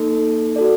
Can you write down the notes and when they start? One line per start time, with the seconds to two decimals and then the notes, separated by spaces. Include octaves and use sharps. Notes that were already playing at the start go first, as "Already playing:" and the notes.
Already playing: A#3 D#4 A4
0.56 F#4 A4 D5